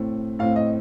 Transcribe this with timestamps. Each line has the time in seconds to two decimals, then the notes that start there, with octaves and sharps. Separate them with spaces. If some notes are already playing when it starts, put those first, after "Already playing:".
Already playing: A2 A3 C4
0.39 A2 A3 C4 F5
0.56 D#5